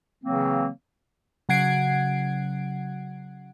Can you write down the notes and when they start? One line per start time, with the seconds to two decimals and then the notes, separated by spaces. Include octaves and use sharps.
0.24 C#3 E3 F#3 A#3 C4
1.49 C#3 F#3 F#5 G#6 C7 D7